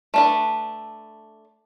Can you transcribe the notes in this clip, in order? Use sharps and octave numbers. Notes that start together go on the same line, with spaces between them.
A3 D4 B4